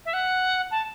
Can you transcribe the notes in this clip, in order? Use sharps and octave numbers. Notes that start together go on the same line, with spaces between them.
E5
F#5
A5